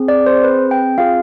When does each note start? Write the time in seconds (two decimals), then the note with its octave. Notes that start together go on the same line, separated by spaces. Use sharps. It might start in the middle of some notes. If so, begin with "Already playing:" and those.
Already playing: C4 G#4
0.08 D5
0.26 C5
0.44 B4
0.71 G5
0.98 C4 F4 G#4 F5